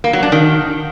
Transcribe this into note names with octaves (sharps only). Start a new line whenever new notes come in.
A#3
F#3
D4
D#3